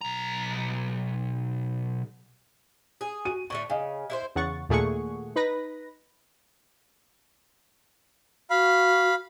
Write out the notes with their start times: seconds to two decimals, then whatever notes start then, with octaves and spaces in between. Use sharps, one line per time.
0.01 B1 A#5
3.01 G#4
3.25 F#4 D#7
3.50 A2 D3 A3 C#6
3.70 C#3 D#5 F5 G#5
4.10 E4 G4 C5
4.35 E2 C#3 F#5 C#6 A6
4.69 D#2 A#2 A3 G#4 F#5 C#6
5.36 D#4 B4 B5 A#6
8.50 F#4 F5 B5